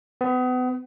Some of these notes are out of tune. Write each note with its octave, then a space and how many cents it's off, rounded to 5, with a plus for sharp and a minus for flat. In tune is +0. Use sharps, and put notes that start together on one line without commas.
B3 +35